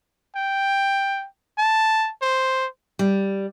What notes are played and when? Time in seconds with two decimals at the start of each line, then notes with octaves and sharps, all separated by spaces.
0.35 G5
1.58 A5
2.22 C5
2.99 G3